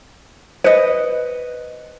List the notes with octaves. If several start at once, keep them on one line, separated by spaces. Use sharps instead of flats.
B4 C5 D#5 C#7